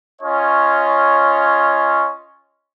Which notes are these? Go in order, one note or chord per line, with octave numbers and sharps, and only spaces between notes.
C#4 F4 C#5 D#5